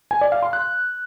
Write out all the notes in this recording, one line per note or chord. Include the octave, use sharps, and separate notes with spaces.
G#5
D5
F5
C6
F#6